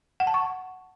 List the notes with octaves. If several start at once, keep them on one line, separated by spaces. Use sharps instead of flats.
F#5
A5
C#6